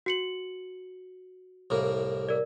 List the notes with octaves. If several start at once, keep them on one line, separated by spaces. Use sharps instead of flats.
F#4 C#7 F#7
C2 A2 A#3
A#4 D5